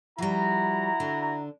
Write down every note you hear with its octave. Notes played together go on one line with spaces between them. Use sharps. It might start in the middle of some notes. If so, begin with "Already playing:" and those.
F3 G3 E4 F#4 A#5
D3 D4